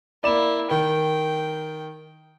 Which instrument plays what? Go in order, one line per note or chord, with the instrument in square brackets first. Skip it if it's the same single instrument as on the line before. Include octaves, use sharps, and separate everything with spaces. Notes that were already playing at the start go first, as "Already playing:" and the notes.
[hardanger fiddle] A#3 E4 [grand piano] D5 E7
[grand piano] D#3 [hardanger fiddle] G5